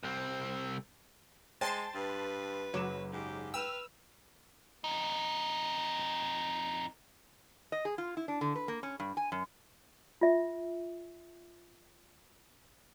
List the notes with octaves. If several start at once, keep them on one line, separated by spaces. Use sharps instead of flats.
C2 C4
G#3 C5 G5 A5 C6 A6
G2 B4
F#1 F#3 D6 E7
G#2 G4
B4 G5 E6 F6
F2 D#4
D#5
G#4
F4
E4
D4
D3
B4
A#3
C#4
G2
G#5
F#2
F4 E5